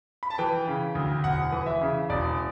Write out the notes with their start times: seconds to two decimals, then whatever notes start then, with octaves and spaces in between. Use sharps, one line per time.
0.23 B5
0.30 A5
0.38 E3 G5
0.68 C#3
0.95 D2
1.24 E1 F#5
1.52 E3
1.66 E5
1.81 C#3
2.09 E1 D5